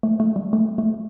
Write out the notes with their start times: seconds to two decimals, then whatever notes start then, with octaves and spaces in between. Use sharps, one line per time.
0.03 A3
0.20 A3
0.36 G3
0.53 A3
0.78 A3